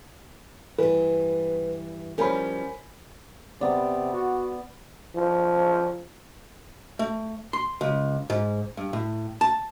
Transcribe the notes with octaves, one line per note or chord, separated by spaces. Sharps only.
G2 E3 B4
F3 G3 C#4 A#4 G#5 B5
C3 B3 D5
F#4
F3
A3
C6
C#2
G#2
G2
A2
A5